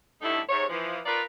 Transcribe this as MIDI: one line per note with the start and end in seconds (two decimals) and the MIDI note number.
0.22 0.39 45
0.22 0.39 50
0.22 0.39 55
0.22 0.39 57
0.22 0.39 63
0.22 0.39 64
0.49 0.64 44
0.49 0.64 48
0.49 0.64 73
0.69 0.98 52
0.69 0.98 53
1.05 1.20 63
1.05 1.20 65
1.05 1.20 70
1.05 1.20 71
1.05 1.20 74
1.05 1.20 77